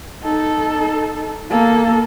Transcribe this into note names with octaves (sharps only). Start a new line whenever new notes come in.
D#4 A4
A#3 A4